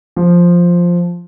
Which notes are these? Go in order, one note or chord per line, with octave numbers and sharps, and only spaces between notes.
F3